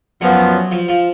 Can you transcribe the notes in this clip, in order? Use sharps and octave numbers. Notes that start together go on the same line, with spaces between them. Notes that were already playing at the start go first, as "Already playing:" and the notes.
F#2 F3 F#3 B3
F3
F3